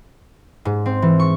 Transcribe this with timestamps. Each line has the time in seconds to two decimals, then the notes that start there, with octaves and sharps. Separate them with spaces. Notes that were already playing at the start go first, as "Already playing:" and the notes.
0.65 G#2
0.86 C4
1.02 E3
1.19 C#6